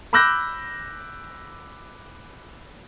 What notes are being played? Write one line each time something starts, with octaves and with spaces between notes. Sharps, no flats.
B5 D6 E6 F#6 G6 A#6